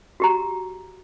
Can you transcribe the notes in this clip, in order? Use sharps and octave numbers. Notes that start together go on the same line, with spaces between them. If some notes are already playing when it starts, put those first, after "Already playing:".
F#4 G4 A#5